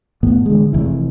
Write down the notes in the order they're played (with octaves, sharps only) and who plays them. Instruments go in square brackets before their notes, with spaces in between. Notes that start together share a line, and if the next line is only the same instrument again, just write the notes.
[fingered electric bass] A2 E3 B3
D3 G#3
F1 E3